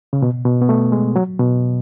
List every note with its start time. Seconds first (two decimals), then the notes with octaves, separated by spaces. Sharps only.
0.13 C#3
0.22 B2
0.45 B2
0.61 B3
0.69 A3
0.92 G#3
1.16 F#3
1.39 B2